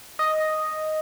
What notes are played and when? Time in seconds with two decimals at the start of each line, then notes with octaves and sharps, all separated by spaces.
0.19 D#5